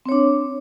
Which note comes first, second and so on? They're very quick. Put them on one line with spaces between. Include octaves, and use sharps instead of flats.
C4 C#5 D4